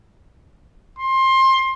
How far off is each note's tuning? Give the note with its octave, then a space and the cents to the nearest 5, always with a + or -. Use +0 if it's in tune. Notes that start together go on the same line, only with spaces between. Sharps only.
C6 +20